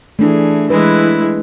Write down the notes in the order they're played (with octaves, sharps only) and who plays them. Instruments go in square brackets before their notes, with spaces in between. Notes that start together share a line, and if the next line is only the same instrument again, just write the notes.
[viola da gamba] E3 G#4 [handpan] A3 D4
[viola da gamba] E3 G#3 E4 [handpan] B4